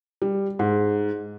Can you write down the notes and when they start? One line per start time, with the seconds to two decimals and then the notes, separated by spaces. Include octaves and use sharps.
0.22 G3
0.59 G#2